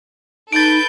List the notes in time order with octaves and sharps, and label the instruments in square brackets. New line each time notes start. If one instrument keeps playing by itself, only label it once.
[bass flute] D#4 [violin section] A4 B4 G6 [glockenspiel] A6 D7